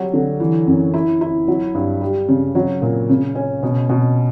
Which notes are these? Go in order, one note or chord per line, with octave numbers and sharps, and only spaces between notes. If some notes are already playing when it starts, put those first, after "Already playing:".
Already playing: F#3 G3
D3
E3
F#2
E4
E4
F#3
G2
G3
C#3
F#3
A#2
C#3
C#4
B2
B2